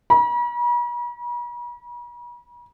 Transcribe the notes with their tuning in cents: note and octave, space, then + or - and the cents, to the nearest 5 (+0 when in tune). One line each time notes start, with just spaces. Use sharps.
B5 -45